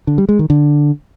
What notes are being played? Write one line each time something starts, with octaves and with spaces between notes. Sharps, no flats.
D3
G3
G#3
D#3
D3